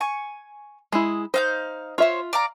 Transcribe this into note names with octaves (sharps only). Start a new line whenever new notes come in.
G#5 C#6
G#3 E4 G#4
D#4 C5 F5 G6
F4 C5 C#5 E5
D5 F5 A#5